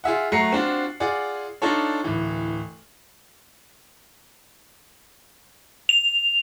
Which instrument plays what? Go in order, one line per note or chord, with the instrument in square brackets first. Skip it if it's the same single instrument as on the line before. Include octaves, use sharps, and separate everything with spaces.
[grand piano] F4 G#4 E5 F#5
F#3 A3 F#5 A#5 C7 C#7
C4 D4 F4 F#4
F4 G#4 D5 F#5
D4 D#4 F4 A4 C#5
D1 E3
[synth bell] F7